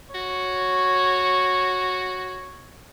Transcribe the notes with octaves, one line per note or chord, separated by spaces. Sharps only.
F#4 C#5